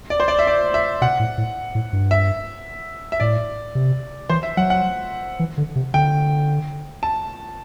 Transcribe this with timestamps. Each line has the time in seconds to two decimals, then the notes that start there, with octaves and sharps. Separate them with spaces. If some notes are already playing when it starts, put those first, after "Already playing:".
0.10 D5
0.20 C5
0.28 D5
0.39 E5
0.47 D5
0.74 E5
1.01 B2 F#5
1.19 A2
1.38 A2
1.75 A2
1.93 G2
2.11 E5
3.12 E5
3.20 A2 D5
3.75 C3
4.30 E3 C5
4.43 E5
4.57 F#3 F#5
4.70 F#5
5.39 E3
5.58 D3
5.76 C3
5.94 D3 G5
7.03 A5